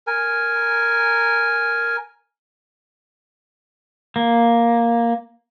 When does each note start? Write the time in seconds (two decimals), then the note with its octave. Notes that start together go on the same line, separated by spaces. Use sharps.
0.07 A#4 G#5
4.16 A#3